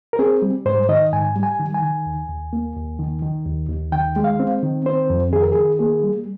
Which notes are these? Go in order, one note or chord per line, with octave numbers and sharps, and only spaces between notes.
A#4
C4 G#4
G3
G#2 C5
D#3 D#5
G#2 G#5
G3
G#5
D#3
G#5
D#3
D#2
D#2
A#3
D#2
D#3
D#3
D#2
D#2
D#3 G5
G#3
F5
C4
D#3
C4 C5
F2
D#3 G#4
A#4
D#3 G#4
A#3 G#4
G3